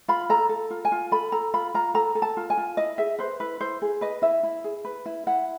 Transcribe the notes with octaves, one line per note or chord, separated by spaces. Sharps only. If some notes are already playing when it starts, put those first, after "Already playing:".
F4 B5
A4 A#5
A4
F4
G#5
F4
A4 B5
A4 A#5
F4 B5
F4 A#5
A4 A#5
A4
A5
F4
G#5
F4
E4 D#5
G#4 E5
B4 C5
E4 B4
E4 C5
G#4
B4 D#5
E4 E5
E4
G#4
B4
E4
E4 F#5